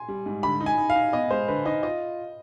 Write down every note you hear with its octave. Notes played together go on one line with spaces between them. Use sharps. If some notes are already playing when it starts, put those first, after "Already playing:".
Already playing: G#5 C6
G3
G#2
D3 B5
D#4
G#5
D#4
F5
D#4
B3 D#5
G#3 C5
D3 B4
D#4 D#5
F4 D#5